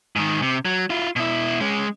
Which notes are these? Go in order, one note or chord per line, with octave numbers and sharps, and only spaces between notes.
G#2 D#3
C3
F#3
E4 F4
B2 E4
G#3 C#4